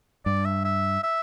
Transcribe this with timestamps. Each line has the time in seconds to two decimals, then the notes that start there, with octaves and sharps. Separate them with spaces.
0.25 G2 D5
0.45 E5
0.65 E5
1.04 E5